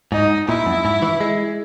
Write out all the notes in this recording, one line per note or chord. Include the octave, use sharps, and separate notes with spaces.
G#2 D#4
A#2 E4
F#2
G#2
E3
G#3